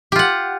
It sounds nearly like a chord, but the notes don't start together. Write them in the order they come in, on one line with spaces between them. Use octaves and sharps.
G4 F4 F#5